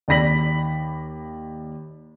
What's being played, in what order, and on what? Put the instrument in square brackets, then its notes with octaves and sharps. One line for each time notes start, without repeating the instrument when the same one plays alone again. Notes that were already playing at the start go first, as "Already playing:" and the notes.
[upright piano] D#2 D5 B5 A#6 B6 F#7